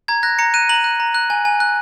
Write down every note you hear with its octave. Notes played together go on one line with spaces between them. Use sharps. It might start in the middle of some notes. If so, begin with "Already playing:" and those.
A#5 G#6
F#6 A#6
A#5 C#7
F#6 D#7
A#5 F#7
F#6
A#5
F#6
G#5
G#5
F#6